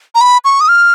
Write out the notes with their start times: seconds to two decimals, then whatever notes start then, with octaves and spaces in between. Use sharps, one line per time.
0.15 A#5
0.21 B5
0.45 C#6
0.61 D#6
0.68 F6